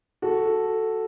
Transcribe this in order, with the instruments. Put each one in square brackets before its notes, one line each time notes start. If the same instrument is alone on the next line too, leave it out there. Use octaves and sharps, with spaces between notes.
[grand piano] F#4 A4